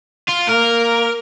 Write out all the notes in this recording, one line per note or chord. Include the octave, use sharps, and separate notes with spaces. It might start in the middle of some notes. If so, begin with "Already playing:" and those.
F4
A#3 A#4